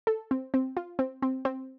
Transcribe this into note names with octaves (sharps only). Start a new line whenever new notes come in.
A4
C4
C4
F4
C4
C4
C4